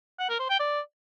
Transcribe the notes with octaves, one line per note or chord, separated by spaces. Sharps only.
F#5
A#4
C5
G5
D5